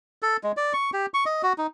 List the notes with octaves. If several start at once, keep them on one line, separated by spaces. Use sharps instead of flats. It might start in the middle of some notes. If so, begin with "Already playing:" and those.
A4
G#3
D5
C#6
G4
C#6
D#5
F#4
D#4